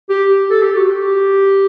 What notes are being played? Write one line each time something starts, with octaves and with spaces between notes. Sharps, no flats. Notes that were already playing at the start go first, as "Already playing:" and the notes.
G4
G4
A4
G4
F#4
G4